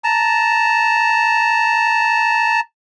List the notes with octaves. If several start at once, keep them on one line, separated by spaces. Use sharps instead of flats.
A5 A#5